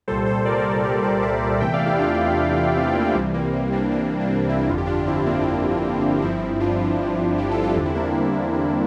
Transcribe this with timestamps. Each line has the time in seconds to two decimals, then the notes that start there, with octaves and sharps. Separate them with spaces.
0.08 C2 A#2 G3 A4 C5
0.26 A4 C5
0.45 A#4 D5
0.58 A#4 D5
0.72 A4 C5
0.83 G4 A#4
1.03 A4 C5
1.22 C5 E5
1.60 E2 C3 E3 A3 E5 G5
1.74 D5 F5
1.86 E4 G4
1.99 D4 F4
2.76 C4 E4
2.95 A#3 D4
3.14 C2 C3 E3 G3 C4
3.34 A#3
3.53 C4
3.72 A#3 D4
3.91 A#3 D4
4.21 D4
4.30 C4
4.49 C4 E4
4.69 G1 F2 D3 F4
4.78 G4
4.86 D4 F4
5.07 C4 E4
5.26 A#3 D4
6.22 G1 G2 F3 C4 E4
6.60 D4 F4
7.38 E4 G4
7.51 F4 A4
7.63 F4 A4
7.76 E2 D3 G3 D4 F4
7.85 C4 E4
7.95 A#3 D4
8.05 C4
8.15 C4
8.54 A#3